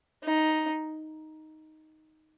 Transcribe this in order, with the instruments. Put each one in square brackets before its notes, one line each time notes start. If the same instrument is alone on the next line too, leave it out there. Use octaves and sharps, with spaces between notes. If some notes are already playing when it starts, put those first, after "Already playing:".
[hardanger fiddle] D#4